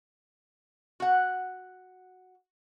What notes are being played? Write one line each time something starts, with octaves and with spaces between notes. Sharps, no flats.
F#4 F#5